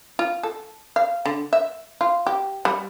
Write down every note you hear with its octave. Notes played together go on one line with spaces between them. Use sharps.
F4
A4
F5
D3
E5
F4
G4
G3